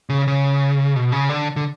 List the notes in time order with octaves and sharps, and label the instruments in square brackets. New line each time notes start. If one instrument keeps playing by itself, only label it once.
[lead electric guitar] C#3
C#3
B2
C#3
D3
D3